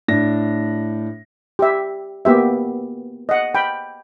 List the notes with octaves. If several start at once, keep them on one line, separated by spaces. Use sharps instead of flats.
A2 D4 A#6
G4 E5
A#3 B3 G4 E5
D#5 F#5
G5 B5